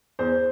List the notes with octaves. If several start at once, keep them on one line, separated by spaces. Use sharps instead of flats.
E2 C5